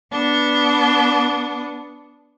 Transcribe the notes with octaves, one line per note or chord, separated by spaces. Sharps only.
B3 D4